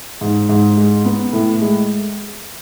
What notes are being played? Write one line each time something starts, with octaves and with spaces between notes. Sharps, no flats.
G#2
G#2
G#3
B3
A2
G#3